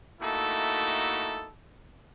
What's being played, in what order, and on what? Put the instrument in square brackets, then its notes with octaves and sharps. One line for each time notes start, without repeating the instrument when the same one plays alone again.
[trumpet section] A3 A#3 D#4 E4 F#4 A4